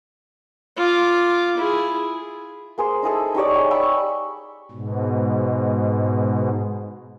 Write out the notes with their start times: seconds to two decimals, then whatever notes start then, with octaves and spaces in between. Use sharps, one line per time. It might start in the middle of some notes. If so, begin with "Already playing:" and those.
0.77 F4 D6
1.57 E4 G#4
2.78 A#3 G#4 C5
3.02 D#4 E4 G#4 A4
3.35 D#4 G4 C#5 D5
3.55 G#4 G5
3.71 B5 C#6 E6
4.71 G#2 B2